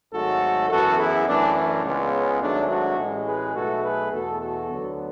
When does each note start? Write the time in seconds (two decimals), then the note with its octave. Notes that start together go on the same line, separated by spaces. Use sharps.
0.13 G#1 G#2 F#3 A3 F#4 A4
0.70 F#2 E3 B3 F#4 A4
0.98 E4 G#4
1.27 F#2 E3 A3 D4
1.56 D4
1.85 C#2 C#3 G#3 B3
2.13 C#4
2.42 G#1 G#2 F#3 A3 D4
2.70 D4 F#4
2.99 A1 A2 G#3
3.27 G#4 B4
3.55 B1 B2 A3 F#4 A4
3.84 G#4 B4
4.12 E2 B2 A3 F#4 A4
4.41 F#4 A4
4.70 D2 D3 F#3 B3